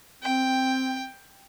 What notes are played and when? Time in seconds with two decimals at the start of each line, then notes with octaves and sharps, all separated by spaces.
0.23 C4 G5